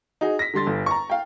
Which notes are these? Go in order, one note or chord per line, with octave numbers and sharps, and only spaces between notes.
D#4 F#4 G#4
A#6 B6
D3 G3 C6 A6
G1
A#5 C#6
F5 G5